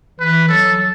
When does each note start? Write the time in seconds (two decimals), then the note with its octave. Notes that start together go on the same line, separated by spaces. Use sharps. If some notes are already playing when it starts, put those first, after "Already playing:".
0.20 E3 B4
0.49 F#3 A4